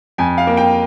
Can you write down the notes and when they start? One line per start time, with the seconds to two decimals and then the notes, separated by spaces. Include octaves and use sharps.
0.18 F2 G#5
0.38 F5
0.47 A#3
0.57 G5